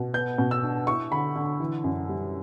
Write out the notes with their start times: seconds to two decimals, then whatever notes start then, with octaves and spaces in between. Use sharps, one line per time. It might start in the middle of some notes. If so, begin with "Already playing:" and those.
Already playing: B2
0.14 B3 G6
0.38 B2
0.51 E6
0.63 D4
0.87 E4 C#6
1.12 D3 B5
1.36 D3
1.60 E3
1.84 F#2
2.09 G3